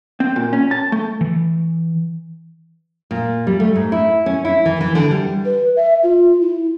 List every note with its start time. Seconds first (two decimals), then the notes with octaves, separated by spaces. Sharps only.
0.20 C4
0.36 A#2
0.53 C#4
0.71 A5
0.92 A3
1.21 E3
3.11 A#2
3.47 G3
3.60 A3
3.76 G#2
3.92 E4
4.26 C#4
4.45 E4
4.65 E3
4.81 E3
4.95 D3
5.11 G3
5.45 B4
5.76 E5
6.03 F4
6.41 E4